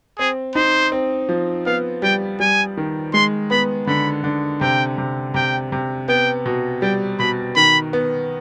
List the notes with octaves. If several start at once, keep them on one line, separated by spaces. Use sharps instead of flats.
C4 G#4
D#4 C5
C4
F3
B3 F5
G3 G5
G3 G#5
D#3
G#3 C6
B3 B5
D3 B5
D3
C3 G5
C3
C3 G5
C3
B3 G5
B2
G3 G5
B2 B5
D#3 B5
B3